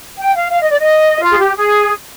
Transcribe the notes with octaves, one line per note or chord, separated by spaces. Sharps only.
G5
F5
F5
D#5
D5
D#5
F4
G#4
G4
G#4